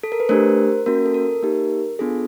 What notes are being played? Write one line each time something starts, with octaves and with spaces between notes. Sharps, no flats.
A4
A#4
B4
A3 D4 G4 A#4 C5
A#3 C#4 F#4 A#4
A4
A#4
A#3 D#4 G4
B3 D4 F4 G#4 A4